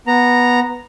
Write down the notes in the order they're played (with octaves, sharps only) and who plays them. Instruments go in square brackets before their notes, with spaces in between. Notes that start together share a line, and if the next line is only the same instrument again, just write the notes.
[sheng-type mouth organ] B3 A#5